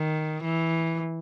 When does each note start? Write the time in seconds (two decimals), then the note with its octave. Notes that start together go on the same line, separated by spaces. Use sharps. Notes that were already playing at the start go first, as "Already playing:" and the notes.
Already playing: D#3
0.43 E3